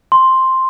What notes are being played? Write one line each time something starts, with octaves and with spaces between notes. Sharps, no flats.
C6